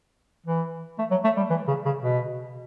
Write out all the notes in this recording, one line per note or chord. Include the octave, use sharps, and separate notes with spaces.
E3
A3
F#3
A3
G3
E3
C#3
C#3
B2